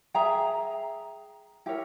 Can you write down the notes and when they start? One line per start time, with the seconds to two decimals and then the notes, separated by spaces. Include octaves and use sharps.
0.14 G#4 E5 G5 A#5
1.66 E4 G4 A#4 C#5